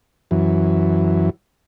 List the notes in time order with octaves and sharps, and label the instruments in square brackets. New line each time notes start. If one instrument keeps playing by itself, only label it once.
[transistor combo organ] F#2 E3